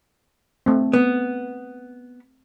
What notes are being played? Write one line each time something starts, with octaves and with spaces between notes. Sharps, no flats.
A3 C4
B3